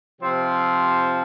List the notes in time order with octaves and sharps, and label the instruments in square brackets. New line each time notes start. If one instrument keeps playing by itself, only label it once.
[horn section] C3 F3 C4